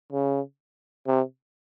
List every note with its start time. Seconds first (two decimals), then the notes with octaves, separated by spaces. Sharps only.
0.12 C#3
1.07 C3